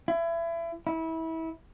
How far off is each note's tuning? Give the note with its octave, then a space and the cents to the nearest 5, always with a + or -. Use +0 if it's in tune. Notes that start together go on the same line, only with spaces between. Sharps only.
E4 +30
E4 -25